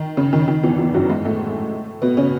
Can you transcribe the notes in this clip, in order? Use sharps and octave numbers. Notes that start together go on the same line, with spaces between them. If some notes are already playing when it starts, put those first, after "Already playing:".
Already playing: D#3
C#3
D#3
D#3
E2 E3
E2 E3
F#2 F#3
G#2 G#3
A2 A3
B2 B3
C#3 C#4